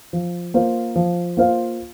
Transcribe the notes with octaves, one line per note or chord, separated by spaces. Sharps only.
F3
A#3 F4 C5 F5
F3
A#3 F4 C5 F5